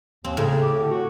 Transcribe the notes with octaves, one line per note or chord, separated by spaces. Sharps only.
D#2 C4
A2 C#3
G4
D3
F#4